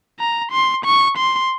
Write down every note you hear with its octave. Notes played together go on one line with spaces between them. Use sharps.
A#5
C6
C#6
C6